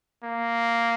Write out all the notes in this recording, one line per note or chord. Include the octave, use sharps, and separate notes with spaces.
A#3